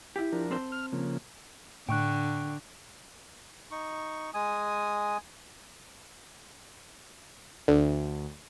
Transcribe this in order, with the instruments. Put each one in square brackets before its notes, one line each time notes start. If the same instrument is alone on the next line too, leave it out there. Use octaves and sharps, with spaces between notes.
[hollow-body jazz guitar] E4 G4
[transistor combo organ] F3 D4 A#4
[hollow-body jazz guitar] C4 A4 C5
[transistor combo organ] F6
C#3 F3 A#3
[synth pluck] A2 [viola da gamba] D3 [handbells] G5 C#6 F#6
[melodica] D#4 C#6
G#3 G#5 D#6
[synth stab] D2